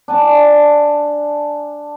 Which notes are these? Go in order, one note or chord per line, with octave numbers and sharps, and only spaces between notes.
D4 G#5 A5